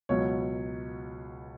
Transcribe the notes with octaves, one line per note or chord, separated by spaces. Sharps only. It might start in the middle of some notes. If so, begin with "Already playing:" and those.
C#2 B2 F#3 C#5